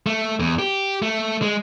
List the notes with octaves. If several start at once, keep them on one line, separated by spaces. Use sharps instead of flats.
A3
E2
G4
A3
G#3